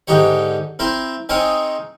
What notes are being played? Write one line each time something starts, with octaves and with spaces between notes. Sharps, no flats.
G#2 D3 D#4 G4 C#5
C4 E4 A#4 C5
C4 D#4 G#4 A#4 C5 C#5